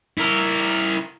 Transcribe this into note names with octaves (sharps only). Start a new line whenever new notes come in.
E4 A#4